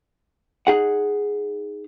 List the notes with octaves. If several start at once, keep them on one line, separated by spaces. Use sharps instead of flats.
D#4 G#4 F#5